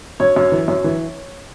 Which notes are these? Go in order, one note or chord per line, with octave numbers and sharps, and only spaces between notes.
F#2 C#5
F#2
E3
F#2
E3